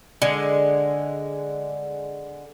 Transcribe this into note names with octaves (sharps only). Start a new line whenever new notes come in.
D3 G#3